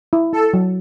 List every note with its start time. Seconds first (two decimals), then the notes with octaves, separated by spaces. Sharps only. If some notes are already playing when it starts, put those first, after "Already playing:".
0.13 E4
0.33 E4 A4
0.54 F#3